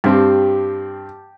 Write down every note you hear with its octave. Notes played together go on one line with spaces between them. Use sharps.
G2 C4 G4 A5